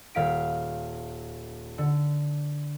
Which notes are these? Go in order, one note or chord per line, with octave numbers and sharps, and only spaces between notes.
D#1 F5 B6 D7
D3